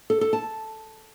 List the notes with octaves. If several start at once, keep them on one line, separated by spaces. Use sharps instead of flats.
A4
A4
A5